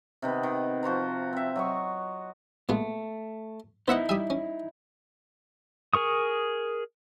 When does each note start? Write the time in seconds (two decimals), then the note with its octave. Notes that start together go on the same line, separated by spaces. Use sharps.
0.22 C3 D#3 B3
0.43 D#3
0.83 F3 F#4 C5 A#5
1.33 C4 E5
1.56 F#3 D#5 C#6
2.69 A#2 G#3 A3 B3 F4
3.88 B3 D#4 E4 C5 D#5 E5 F#5
4.09 G3 E5 G#5 D#6
4.30 C#4
5.93 G#4 A#4 C#6 D#6